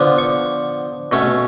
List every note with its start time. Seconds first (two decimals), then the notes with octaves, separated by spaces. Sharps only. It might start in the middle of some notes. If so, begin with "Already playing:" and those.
Already playing: D3 F3 B3
0.18 C#6
1.12 B2 A3 C#4